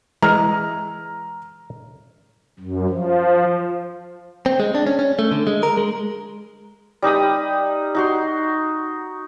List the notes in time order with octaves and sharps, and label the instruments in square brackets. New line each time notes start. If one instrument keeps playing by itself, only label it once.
[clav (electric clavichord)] E3 G#3 [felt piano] A#5 F6
[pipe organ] F#2
F3
[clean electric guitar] C4
G#3
D4
C#4
C#4
A3
D3
G#3
A#4
G#3
[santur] G3 D#4 B5 D#6
D#4 F#4 C6